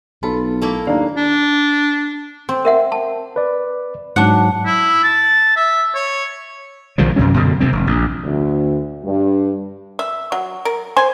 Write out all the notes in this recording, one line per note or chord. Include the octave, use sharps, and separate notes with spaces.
B1 F4 A4 A5 B5
A3 A#3 E4
D#2 D4 F5 A#5
D4
C4
A#4 E5 F#5
A5
B4 D5
G#2 F#3 D4 D5 F#5
E4
A5
E5
C#5
B1 D#3 F3 G3
F#2 C3 F#3 C#4
F#2 B2 D3
F2 C3 F3 C4
F1
A#1
D2
G2
E5
F#3
A#4
C5 G#5